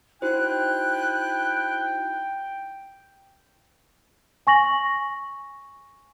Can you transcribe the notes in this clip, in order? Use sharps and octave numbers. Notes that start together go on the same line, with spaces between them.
D#4 E4 F#4 C5 G5 F#6
G#5 C#6 A#6 F#7